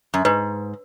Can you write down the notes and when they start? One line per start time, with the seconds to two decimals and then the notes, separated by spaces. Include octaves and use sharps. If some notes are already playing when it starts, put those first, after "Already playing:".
0.14 F#2
0.25 G#2 B4